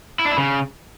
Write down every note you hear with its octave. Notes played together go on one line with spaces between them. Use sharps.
E4
D4
E4
C#3